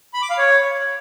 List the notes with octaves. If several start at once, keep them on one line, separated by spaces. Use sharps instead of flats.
B5
D6
F5
C#5